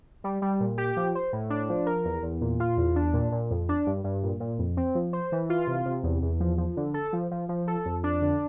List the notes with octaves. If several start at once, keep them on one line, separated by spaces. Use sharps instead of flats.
G3
G3
A#2
G4
F3
C5
A2
D4
F3
A#4
E2
E2
A#2
F4
E2
D4
A#2
A#2
F2
D4
G2
G2
A#2
A#2
F2
C4
F3
C5
E3
F4
C3
C3
E2
E2
F3
F3
D3
A4
F3
F3
F3
A4
F2
D4
D3